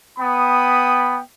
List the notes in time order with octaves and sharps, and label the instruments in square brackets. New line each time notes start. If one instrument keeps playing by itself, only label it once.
[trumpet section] B3 G5 B5 D#6